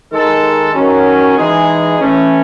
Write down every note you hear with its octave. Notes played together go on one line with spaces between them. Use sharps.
D#3 G#3 D#4 A4
D#3 F#3 C#4
E3 G#3 D#4 G#4
E3 A3 C#4